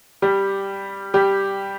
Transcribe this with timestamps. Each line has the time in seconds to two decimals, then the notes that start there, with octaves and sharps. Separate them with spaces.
0.22 G3 G4
1.14 G3 G4